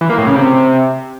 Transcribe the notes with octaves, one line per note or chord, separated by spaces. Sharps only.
E3
A#3
A2
C#3
C3